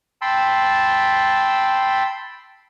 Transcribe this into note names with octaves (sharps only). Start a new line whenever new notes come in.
G5 A5 B5 C6 E6